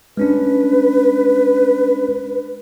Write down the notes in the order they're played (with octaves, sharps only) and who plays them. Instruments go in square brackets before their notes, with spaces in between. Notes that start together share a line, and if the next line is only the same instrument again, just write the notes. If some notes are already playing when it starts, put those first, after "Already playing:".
[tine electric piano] G#3 C#4 D4 [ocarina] B4